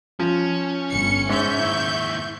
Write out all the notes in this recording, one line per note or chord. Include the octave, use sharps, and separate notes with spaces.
F3 C#4
G1 C#7
G#2 E5 C#6 G6
D#2 E4